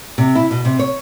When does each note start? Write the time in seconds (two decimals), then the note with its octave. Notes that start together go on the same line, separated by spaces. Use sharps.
0.18 C3
0.35 E4
0.51 B2
0.65 C3
0.79 C#5